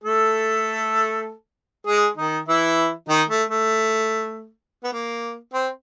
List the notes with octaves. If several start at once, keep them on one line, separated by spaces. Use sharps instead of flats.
A3 A4
G#3 G#4
D#3 D#4
E3 E4
D#3 D#4
A3
A3
B3
A#3
C4